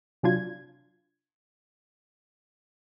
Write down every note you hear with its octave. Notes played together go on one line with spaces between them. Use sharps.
C3 F#3 D4 F4 G#6